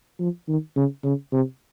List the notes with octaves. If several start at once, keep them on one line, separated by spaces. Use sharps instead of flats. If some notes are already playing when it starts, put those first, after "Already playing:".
F3
D#3
C#3
C#3
C3